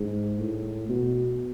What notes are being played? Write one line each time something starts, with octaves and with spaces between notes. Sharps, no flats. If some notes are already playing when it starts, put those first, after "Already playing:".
Already playing: G#2
A2
B2